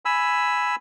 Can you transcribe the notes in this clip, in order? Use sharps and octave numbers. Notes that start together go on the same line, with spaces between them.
G#5 B5 E6